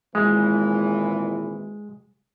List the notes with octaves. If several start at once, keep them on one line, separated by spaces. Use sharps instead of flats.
G#1 A#2 E3 G#3